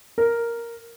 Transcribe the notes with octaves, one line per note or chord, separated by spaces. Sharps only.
A#4